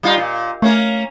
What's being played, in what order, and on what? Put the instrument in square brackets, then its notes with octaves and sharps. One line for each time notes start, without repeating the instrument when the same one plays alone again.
[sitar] G3 D#4 F4
A#2
[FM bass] A3 [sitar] A#3 C#4 A#4